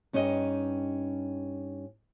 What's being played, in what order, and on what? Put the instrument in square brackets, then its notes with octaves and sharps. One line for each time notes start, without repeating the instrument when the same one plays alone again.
[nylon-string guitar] G2 C#4 D#4 G4 D#5